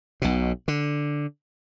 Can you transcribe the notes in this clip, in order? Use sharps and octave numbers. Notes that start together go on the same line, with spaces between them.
B1 B2
D3